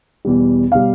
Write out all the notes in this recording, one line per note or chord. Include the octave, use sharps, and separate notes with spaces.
E2 B2 G3
B2 G3 F5